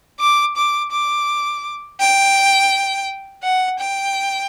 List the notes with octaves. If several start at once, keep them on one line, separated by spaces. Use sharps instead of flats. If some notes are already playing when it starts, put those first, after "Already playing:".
D6
D6
D6
G5
F#5
G5